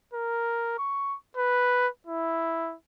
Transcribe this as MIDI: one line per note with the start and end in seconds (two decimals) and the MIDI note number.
0.13 0.73 70
0.78 1.16 85
1.37 1.88 71
2.07 2.75 64